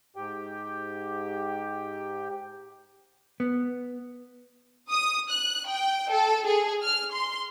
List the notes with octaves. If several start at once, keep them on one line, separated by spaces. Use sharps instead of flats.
G#2 G4 G5
B3
D#6
F#6
G5
A4
G#4
F6
C6